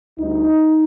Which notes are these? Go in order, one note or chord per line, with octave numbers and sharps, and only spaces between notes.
D2 D3 G3 D#4